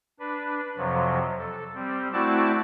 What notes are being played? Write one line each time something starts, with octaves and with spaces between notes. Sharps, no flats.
D4 B4
F2 C3 F3 F#3
A4
G3 C4
A3 C4 E4 F#4 D5 A5